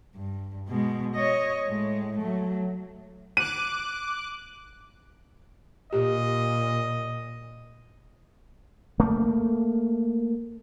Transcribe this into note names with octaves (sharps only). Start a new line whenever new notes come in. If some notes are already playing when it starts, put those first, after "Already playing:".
G2
B2 G#3
C#5 D#5
A2 G#3
F#3 A3
D6 F#6 D#7
A#2 G4 D#5
A3 A#3